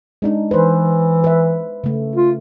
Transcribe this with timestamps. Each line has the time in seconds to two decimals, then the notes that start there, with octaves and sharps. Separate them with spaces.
0.22 G#3 D4 D#4
0.51 E3 B4 C5
1.24 B4 E5
1.84 C#3 A3
2.16 F4